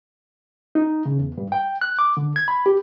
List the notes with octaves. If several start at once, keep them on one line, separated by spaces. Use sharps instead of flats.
D#4
C#3
E2
G2
G5
F#6
D6
D3
G#6
B5
G4